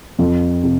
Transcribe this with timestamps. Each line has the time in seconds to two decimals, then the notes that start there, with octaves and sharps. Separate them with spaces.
0.19 F2
0.63 C3